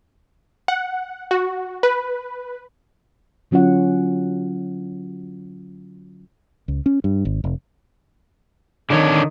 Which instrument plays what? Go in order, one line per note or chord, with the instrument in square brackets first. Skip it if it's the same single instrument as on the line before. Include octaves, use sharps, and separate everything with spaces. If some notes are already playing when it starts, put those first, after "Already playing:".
[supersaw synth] F#5
F#4
B4
[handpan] D3 F#3 C#4 F4 F#5
[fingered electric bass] C#2
C#4
G2
G#1
F1
[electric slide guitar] D3 D4 C#5 [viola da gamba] D#3